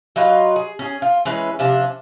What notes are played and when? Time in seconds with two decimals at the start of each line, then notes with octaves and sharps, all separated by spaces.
0.16 F#3 D#4 F4 B4
0.56 G#4
0.79 C#4 G#4
1.02 F4
1.25 E3 G#3 C#4 B4
1.59 C3 F3 C#4 D4